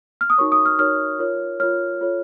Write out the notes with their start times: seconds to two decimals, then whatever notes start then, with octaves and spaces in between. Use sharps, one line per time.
0.21 F6
0.30 D#6
0.38 D#4 F#4 A#4 C#5 C#6
0.52 D#6
0.66 F6
0.78 D#4 F#4 A#4 C#5 F6
1.19 F4 A#4 C#5
1.60 F4 A#4 C#5 F6
2.01 F4 A4 C#5